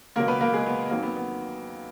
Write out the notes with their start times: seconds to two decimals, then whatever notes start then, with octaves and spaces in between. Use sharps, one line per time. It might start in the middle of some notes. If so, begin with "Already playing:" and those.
0.16 C#2 B2 F#3 A#3 A#4
0.28 B3 B4
0.41 A#3 A#4
0.53 G#3 G#4
0.66 B3
0.90 F2 D#3 F#3 A#3
1.03 B3
1.16 B3